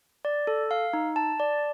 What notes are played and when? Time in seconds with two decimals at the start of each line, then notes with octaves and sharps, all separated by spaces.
0.25 D5
0.47 A4
0.71 F5
0.93 D#4
1.16 A5
1.40 D5